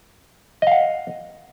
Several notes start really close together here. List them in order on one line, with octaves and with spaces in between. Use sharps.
D#5 F5 F#5